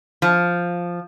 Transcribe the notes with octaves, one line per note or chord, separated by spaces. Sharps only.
F3